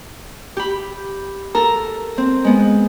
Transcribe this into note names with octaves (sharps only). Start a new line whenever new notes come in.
G4 B5
A4 A#4 A#5
C4
G#3 B3